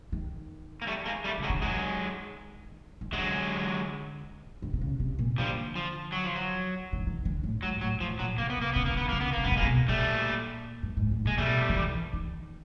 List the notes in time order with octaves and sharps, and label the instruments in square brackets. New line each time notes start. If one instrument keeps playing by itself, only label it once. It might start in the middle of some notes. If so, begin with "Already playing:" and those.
[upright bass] D#3
[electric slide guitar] A#3
G3 A3
G#3 A#3
G3 A3
[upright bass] C#3
[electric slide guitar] F#3 G#3
[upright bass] D3
[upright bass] D#3 [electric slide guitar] F#3 G#3
[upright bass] D#3
[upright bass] D3 [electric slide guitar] F#3 G#3
[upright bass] D3
C3
C#3
C3
A#2
[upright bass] D3 [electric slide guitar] F3 G3
[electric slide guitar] F3
F#3
F3
F#3
[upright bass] D3
D#3
E3
D3
A2
[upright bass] G#2 [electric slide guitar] F#3
[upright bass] A2 [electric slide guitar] F#3
[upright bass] A2 [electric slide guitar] F3
[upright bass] A#2 [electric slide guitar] F#3
[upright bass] C3 [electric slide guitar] A#3
[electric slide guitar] B3
[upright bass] C3 [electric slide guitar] A#3
[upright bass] C#3 [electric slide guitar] B3
[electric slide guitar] A#3
[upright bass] D3 [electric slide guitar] B3
[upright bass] C#3 [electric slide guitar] A#3
[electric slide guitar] B3
[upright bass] C3 [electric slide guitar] A#3
[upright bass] C#3 [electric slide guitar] B3
[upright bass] C3
[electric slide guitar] G#3 A#3
[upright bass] B2
[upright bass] A#2 [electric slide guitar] G3 A3
[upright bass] G2
G#2
A2
[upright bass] A#2 [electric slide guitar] G#3
[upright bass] B2 [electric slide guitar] G3 A3
[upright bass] D#3
E3
D#3